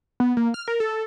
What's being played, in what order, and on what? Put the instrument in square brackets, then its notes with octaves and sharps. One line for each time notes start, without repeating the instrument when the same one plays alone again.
[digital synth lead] B3
A#3
F6
A#4
A4